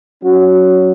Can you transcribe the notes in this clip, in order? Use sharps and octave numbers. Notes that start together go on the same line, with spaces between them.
F#3 C#4 F#4